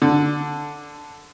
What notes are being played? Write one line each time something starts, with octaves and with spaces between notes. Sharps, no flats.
D3